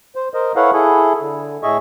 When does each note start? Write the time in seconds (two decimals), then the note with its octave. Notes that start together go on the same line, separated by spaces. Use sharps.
0.16 C5
0.34 A#4 C5 D#5
0.56 E4 A4 B4 C#5 F5 F#5
0.73 E4 G#4 A4
1.20 D3
1.63 A2 G#4 D#5 E5 C#6